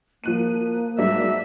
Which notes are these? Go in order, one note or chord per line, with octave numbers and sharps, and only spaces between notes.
F3 A#3 F#6 D#7
G#2 F#3 D4 E5